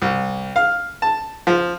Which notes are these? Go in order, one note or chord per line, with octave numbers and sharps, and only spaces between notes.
C2
F5
A5
F3